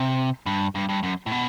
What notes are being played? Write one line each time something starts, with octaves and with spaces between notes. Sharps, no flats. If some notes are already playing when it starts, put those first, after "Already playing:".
Already playing: C3
G2
G2
G2
F#2
A2
B2